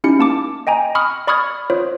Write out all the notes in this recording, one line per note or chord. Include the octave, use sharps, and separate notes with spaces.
C#4 D#4 E4 G4 C#7
A#3 A5 D6
D#5 G5 G#5 A#5
B5 C#6 D#6 F6
D5 B5 C#6 D#6 F6 G#6
F4 C5 C#5